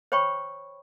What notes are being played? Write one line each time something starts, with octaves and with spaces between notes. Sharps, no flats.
C5 C#5 G5 B5 C#6